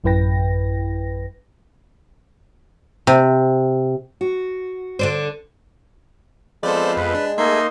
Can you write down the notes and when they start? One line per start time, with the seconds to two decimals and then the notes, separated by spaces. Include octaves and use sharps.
0.04 A1 F#2 E4 B4 G5 A#6
3.07 C3
4.21 F#4
4.99 D3 D4 C5
6.63 F3 G#3 B3 C4 A4 C5 D5
6.97 F2 B4
7.15 D4
7.38 A3 A#3 D#4 G#4 E5 C6